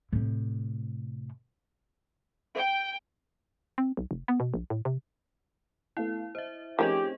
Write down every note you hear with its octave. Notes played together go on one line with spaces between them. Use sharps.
A2 C3
G5
C4
B1
F1
B3
B2
A#1
A2
C3
A3 B3 E4 F5
C5 D#5 E5
D#3 F3 A3 C4 C#4 G4 G#4 D#5